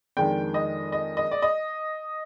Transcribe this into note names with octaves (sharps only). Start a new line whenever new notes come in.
F2 D#3 G#3 D4 G5
D#5
D#5
D#5
D5
D#5